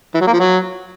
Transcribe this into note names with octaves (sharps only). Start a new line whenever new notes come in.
E3
F#3
A#3
F3
F#3